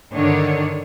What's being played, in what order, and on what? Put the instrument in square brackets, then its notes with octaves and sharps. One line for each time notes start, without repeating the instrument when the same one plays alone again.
[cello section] G2 D3 D#3 D4 C#5